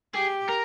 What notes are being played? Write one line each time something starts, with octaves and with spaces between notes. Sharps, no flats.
G4 G#4
A#4